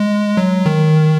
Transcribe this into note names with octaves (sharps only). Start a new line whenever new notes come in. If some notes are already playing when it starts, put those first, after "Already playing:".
Already playing: G#3
F#3
D#3